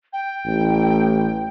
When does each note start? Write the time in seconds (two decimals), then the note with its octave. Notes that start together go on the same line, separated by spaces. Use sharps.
0.13 G5
0.46 A1